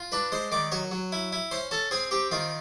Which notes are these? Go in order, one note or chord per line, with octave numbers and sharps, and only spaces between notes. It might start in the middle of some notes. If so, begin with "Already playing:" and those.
Already playing: F4
D4 B4 B5
G#3 C5 C6
D#3 D5 D6
F#3 C#5 C#6
F#3
E4
E4
C#4 C5 C6
C#4 A4 A5
C4 G#4 G#5
C4 G4 G5
D#3 F4 F5